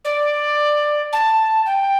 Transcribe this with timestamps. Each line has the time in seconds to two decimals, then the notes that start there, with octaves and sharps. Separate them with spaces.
0.04 D5
1.12 A5
1.66 G5